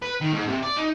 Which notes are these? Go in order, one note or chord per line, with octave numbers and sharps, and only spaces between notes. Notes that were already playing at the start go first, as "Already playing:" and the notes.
B4
D#3
G#2
C3
D5
D#4